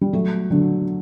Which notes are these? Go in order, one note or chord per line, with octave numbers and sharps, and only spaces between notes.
G3
F#3 A3
D3 F#3